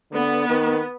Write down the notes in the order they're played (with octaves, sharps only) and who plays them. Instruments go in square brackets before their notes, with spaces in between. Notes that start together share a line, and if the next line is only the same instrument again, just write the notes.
[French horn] D3 [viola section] B3
[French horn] D#3